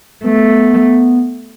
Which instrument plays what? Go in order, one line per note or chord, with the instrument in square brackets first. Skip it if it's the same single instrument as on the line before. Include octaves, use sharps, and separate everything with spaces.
[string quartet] A3 [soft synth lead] B3